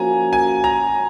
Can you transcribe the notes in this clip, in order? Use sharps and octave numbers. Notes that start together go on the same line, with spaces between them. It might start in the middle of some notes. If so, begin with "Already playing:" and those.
Already playing: F3 A#3 C#4 F#4 G#5 A#5
G#5
A#5